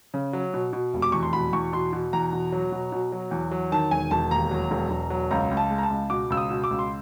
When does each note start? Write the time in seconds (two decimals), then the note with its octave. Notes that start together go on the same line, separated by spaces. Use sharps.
0.14 C#3
0.33 F#3
0.54 B2
0.73 B2
0.94 F1
1.02 D6
1.12 E2 C#6
1.23 C6
1.33 B2 B5
1.53 E2 C#6
1.73 B2 C6
1.93 B2
2.13 E2 A#5
2.33 B2
2.52 F#3
2.72 B2
2.92 B2
3.12 F#3
3.31 E2
3.51 F#3
3.72 D#3 A5
3.91 E1 G#5
4.11 E1 A5
4.31 D#2 A#5
4.51 F#3
4.71 E1
4.91 E1
5.10 F#3
5.31 C#2 A#5
5.51 C#2
5.57 A5
5.70 G#3
5.78 A#5
5.83 A5
5.90 C#2
6.10 B2 D6
6.30 C#2 E6
6.37 D#6
6.50 B2
6.64 D6
6.71 C#2
6.79 C6